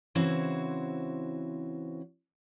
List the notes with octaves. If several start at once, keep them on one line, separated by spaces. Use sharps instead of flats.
C#3 E3 C4 E4 F#4 C5